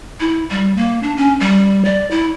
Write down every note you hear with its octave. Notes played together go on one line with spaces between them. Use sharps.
E4
G3
A#3
D4
C#4
G3
D5
E4